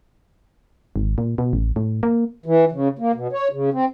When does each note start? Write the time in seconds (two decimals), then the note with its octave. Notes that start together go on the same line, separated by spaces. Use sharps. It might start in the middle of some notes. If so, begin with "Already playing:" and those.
0.96 G#1
1.18 A#2
1.38 B2
1.53 A1
1.76 A2
2.03 A#3
2.46 E3
2.72 C#3
2.99 A#3
3.15 B2
3.33 C#5
3.52 C#3
3.73 C4